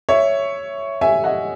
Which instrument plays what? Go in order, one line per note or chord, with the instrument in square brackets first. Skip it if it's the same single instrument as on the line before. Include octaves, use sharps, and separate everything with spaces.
[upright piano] C#5 E5
E5 G#5
D#5 F#5